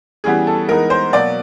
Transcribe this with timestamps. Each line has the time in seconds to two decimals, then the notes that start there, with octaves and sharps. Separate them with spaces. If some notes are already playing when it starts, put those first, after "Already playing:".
0.24 C#3 E3 G3 B3 G#4
0.47 A4
0.68 E3 G#3 B3 D#4 A#4
0.90 C5
1.13 B2 F#3 A#3 D5